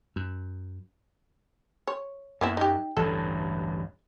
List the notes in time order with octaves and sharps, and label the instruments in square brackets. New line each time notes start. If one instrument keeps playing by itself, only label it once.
[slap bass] F#2
[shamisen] C#5
[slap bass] F#2 [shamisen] A#3 B3 E4
[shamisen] D#4 G4
[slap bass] A1 D2 G2 [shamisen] A4